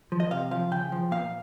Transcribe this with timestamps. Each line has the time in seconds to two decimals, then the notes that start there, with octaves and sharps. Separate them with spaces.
0.12 F3
0.20 D#5
0.31 C3 F5
0.51 F3 F5
0.71 C#3 G5
0.92 F3
1.11 A#2 F5